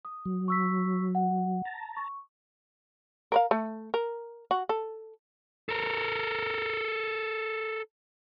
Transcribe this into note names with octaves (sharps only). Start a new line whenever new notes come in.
D#6
F#3
C#6 E6 B6
F#5
A5 A#5
C#6
A#4 B4 F5
A3
A#4
F#4
A4
A4 A#4